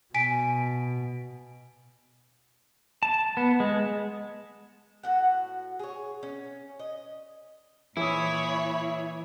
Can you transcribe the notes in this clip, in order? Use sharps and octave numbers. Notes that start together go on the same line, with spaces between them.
B2 G#5 B6 D7
A5
B3
G#3
A2 F#4 F#5
G#4 C#5
C#4
D#5
A#2 E3 E4 C#5 B5 D#6